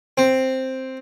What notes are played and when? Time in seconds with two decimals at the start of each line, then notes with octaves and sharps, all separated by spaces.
0.18 C4